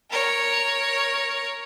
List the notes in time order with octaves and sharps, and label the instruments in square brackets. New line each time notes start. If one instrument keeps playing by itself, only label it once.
[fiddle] A#4 C#5